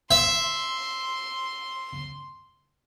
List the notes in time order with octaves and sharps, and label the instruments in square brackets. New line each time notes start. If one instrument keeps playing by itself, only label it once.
[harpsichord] E5 [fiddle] C6